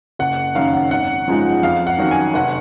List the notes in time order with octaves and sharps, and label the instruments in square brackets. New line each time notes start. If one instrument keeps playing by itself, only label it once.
[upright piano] F#1 F#5
F#2 D#3 F5
F#5
G#1 F#5
F#2 F3 G#3 D#4
F2 F5
F#5
D#3 F#3 C#4
G#5
F1 F#5